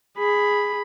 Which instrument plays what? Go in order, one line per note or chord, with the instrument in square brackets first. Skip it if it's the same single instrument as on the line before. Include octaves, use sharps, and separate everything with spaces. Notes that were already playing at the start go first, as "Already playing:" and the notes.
[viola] G#4 B5